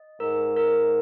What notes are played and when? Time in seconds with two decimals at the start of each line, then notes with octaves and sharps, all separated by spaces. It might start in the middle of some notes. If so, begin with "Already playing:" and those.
Already playing: D#5
0.20 G#2 A#4
0.56 A#4